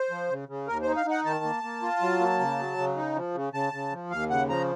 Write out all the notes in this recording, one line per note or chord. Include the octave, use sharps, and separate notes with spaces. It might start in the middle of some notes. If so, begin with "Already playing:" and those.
Already playing: C5
F3
C#3
C#3
D#2 A#4
D#4 C5
F5
D#4 F#5
D#3 A5
A#3
A#3
F4
F#3
A#3
C#3
F#3
C#3
D#4
F3
C#3
C#3 A5
C#3
F3
D#2 F5
C#3 F#5
F3 A#5